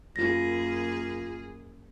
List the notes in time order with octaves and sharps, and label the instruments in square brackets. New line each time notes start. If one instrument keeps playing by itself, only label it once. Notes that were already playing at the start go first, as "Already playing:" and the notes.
[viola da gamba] F#2 A#3 G#4 [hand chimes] F4 A#6